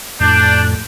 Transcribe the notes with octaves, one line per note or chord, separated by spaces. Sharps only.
F2 A2 D4 G6